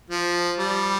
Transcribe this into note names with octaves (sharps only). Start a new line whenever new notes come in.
F3
G3